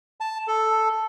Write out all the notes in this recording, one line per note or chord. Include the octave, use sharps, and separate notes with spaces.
A5
A4